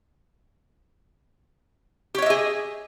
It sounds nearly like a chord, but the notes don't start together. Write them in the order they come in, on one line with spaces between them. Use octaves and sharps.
G4 C#5 D#5 E5 G#4